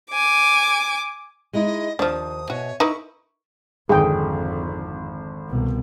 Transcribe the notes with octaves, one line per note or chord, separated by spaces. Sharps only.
G#5 D6
G#3 D#4 E4 D#5
D#2 F3 D4 C5 A5 D#6
B2 F#4 C#5 E5 G#5
D#4 E4 A#4 B4 C#6
G#1 F2 D3 G#4 G5
C2 B2